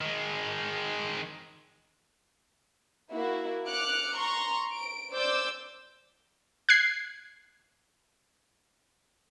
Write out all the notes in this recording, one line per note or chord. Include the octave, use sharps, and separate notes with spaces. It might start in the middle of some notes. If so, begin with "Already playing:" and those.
D#3 G#3
A#3 E4 F#4
D6 F6 F#6 C#7
A#5 C6 C#6
D7
C5 D5 D6 E6 G6
F#6 G#6 C7